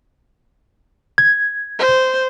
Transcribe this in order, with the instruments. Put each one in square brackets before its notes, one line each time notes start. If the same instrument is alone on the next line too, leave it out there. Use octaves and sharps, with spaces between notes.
[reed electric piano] G#6
[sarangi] C5